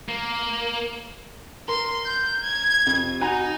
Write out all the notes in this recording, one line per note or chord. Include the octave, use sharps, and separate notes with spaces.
A#3
A#4 C6
G6
G#6
F2 C3
D#4 F#4 G#5 A#5